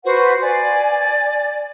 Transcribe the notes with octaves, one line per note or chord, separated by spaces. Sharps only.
F#4 B4 C5 F#5
D5 G#5